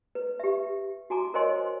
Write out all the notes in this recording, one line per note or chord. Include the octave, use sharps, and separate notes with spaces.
B4
G4 E5
F#4 G#5 A#5 D6
A#4 C5 C#5 D#5 G#5 C6